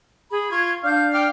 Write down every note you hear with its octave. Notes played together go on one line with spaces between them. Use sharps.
G#4 B5
F4 C#6 G#6
D4 F5 G6
G5 D6 F6